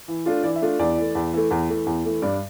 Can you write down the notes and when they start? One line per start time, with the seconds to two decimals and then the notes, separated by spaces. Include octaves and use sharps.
0.08 E3
0.26 A3 D4 F4
0.43 E3 D5
0.56 E5
0.62 A3 D4 F4
0.79 E2 D5
0.97 E3 A3
1.15 E2
1.33 E3 A3
1.51 E2
1.69 E3 A3
1.86 E2
2.05 E3 A3
2.22 G2 D5